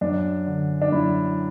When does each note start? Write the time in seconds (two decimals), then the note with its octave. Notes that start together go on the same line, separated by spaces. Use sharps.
0.01 F#2 D4
0.47 D3
0.82 D4
0.92 F#2 E4